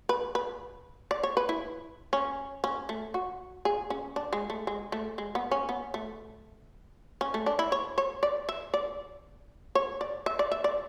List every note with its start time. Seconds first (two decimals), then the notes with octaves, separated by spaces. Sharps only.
0.09 B4
0.35 B4
1.11 D5
1.23 C#5
1.37 B4
1.49 E4
2.13 C#4
2.64 C#4
2.89 A3
3.14 F#4
3.65 G#4
3.90 C#4
4.16 D4
4.33 G#3
4.50 A3
4.67 G#3
4.92 A3
5.18 G#3
5.35 B3
5.51 C#4
5.69 B3
5.94 A3
7.21 C#4
7.34 A3
7.46 D4
7.59 E4
7.72 C#5
7.98 C#5
8.23 D5
8.49 E5
8.74 D5
9.75 C#5
10.01 D5
10.26 E5
10.39 D5
10.52 E5
10.64 D5